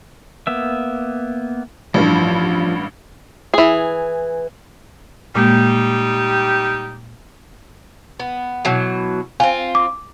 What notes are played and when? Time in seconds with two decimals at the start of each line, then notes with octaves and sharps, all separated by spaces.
0.47 A#3 B3 E5
1.94 A1 G2 F3
3.54 E3 G#4
5.35 A#2 G3 G#3 A#3 D#4 G4
8.19 B3
8.65 B2 E3 F#3
9.40 C4 F4 G#5
9.75 D6